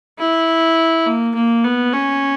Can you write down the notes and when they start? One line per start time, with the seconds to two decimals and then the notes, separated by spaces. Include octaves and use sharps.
0.19 E4
1.06 A#3
1.35 A#3
1.64 B3
1.93 C#4